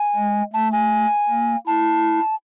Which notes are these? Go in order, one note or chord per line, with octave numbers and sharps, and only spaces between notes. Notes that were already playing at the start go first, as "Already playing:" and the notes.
Already playing: G#5
G#3
A3 A5
G#5
A#3
E4 A5